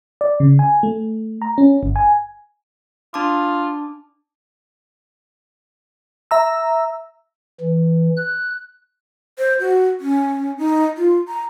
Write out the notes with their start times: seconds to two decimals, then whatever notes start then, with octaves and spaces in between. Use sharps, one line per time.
0.21 D5
0.40 C#3
0.59 G#5
0.83 A3
1.42 A#5
1.58 C#4
1.83 G1
1.96 G#5
3.14 D4 F4 A5 D6
6.31 E5 A#5 E6
7.61 E3
8.17 F#6
9.39 C5
9.60 F#4
10.01 C#4
10.58 D#4
10.97 F4
11.28 A#5